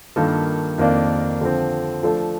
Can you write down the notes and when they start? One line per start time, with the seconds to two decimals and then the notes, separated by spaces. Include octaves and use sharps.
0.16 G2 D#3 A#3 F4 A4
0.78 F2 D#3 A#3 D4
1.41 D3 F3 C4
2.03 F3 A3 D4 A4 C5